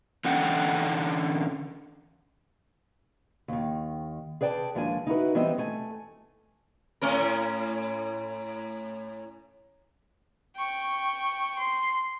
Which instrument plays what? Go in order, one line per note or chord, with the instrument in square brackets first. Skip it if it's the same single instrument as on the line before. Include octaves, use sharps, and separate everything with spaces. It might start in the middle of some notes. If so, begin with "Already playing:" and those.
[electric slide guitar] D3 E3 C#4 A4 F#5 G5
[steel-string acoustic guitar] D#2 D#3
G#4 B4 D5 G5 A5
D#2 F3 G#3 D4 D#5 G#5
D#4 E4 F#4 B4
E3 G3 B3 C4 D#5
A3 G#5
[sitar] A2 C#4 A#4
[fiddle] G5 C#6
C6